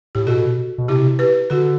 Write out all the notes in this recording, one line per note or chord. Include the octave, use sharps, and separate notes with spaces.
A2 G4
B2 F#4 A4
B2
C3 E4 G4
G4 B4
D3 F#4 A4